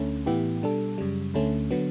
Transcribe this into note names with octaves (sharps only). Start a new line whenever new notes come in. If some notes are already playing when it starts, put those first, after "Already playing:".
Already playing: D2 D3 A3 C#4
A2 E3 B3 E4 G4
B2 G3 D4 A4
F#2 C#3 G3
D2 D3 A3 C#4
D3 F#3 B3